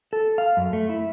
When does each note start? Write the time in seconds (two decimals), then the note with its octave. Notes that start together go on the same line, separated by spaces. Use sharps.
0.13 A4
0.38 F5
0.57 F#2
0.73 A3
0.89 E4